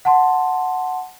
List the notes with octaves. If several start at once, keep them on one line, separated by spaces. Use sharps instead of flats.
F#5 A5 C6